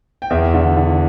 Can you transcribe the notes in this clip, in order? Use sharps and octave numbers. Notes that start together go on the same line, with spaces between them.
G5
E2 E5
D3
D3